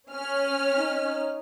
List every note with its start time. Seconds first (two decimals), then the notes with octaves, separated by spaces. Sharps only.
0.12 C#4 F6
0.78 D#4